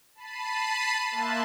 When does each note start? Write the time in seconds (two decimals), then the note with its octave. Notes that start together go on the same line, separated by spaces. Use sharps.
0.15 A5 B5 C7 D#7
1.11 A#3 E5 A5 C6 F#6